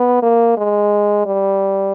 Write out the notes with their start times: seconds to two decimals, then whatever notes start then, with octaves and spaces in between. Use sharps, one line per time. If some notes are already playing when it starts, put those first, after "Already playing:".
Already playing: B3
0.22 A#3
0.57 G#3
1.26 G3